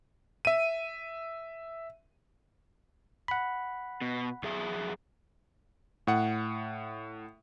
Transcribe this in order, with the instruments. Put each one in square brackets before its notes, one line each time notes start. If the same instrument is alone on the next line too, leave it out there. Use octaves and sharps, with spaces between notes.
[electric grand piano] E5 D#7
[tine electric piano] F#5 B5
[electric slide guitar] B2
F#2 G#4 E5
[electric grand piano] A2 F#5